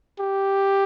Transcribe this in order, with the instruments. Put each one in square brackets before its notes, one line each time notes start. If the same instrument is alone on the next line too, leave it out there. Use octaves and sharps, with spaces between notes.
[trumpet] G4